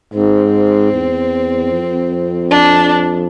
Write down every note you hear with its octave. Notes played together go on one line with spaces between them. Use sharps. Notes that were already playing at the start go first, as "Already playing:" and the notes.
G#2 C4
E2
F2
D4